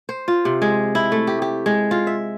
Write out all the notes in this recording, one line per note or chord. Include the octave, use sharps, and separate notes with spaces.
C5
F4
C3
G#3
E4
A3
G4
G4
G#3
F4
E5